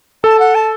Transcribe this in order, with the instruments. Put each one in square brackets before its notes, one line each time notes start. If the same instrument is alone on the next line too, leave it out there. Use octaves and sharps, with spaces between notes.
[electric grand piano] A4 [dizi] A5
[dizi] F#5
A5